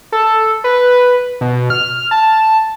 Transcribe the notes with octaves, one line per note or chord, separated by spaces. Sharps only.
A4
B4
B2
F6
A5